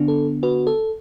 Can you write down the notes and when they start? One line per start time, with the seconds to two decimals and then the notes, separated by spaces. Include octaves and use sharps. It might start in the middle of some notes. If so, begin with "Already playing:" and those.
Already playing: D3 B3 D4
0.08 A4
0.43 F#4 B4
0.67 A4